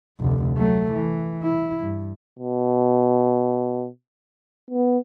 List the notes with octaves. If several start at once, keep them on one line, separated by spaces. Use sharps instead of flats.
F1 D2
F#3 A3
E3
E4
G2
B2
B3